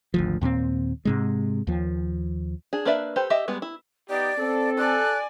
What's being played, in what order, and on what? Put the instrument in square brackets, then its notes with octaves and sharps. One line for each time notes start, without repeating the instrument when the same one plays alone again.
[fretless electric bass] G#1 D2 F3
D#2 A#2 G3 C4
G#2 C3 G#3
D#2 F3
[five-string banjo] D4 G#4
A#3 D4 B4 D5 E5
G4 A4 B4 C5
G4 D#5 E5
G3 G#3 B3
E4
[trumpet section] B3 D#4 G4 [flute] D5
[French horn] C4 [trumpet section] A4
[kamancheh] D5 G#5 [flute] F#6